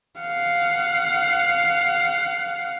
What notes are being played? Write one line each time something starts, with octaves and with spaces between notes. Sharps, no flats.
F5 F#5